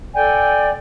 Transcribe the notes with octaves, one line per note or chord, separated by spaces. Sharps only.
A4 D5 G5 G#5